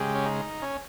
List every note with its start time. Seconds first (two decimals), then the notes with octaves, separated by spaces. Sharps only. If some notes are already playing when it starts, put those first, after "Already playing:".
Already playing: C#3 G#3 G4
0.15 C#4
0.26 D#4
0.62 C#4